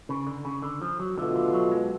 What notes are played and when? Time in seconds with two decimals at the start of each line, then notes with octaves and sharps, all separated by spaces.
0.09 C#3
0.27 D3
0.45 C#3
0.62 D3
0.82 F3
1.00 F#3
1.17 B2 D3 A3 F4
1.36 D3
1.53 F#3
1.71 G#3